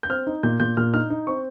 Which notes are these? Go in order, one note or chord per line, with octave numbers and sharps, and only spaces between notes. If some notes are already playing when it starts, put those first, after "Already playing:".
G6
C4 F6
D#4
A#2 G6
A#2 G6
A#2 F6
D#4 F6
D#4
C4 C#6